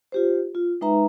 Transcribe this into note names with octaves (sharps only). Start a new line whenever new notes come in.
F4 G4 C5
F4
G#3 D#4 B4 E5 A#5